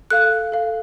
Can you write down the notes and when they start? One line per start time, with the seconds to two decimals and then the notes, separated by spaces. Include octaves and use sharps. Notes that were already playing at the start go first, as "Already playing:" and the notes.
0.10 A4 F5 F#6
0.52 A4 F5